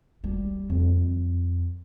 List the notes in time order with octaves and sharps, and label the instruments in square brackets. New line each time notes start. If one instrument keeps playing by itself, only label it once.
[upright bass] G3
F2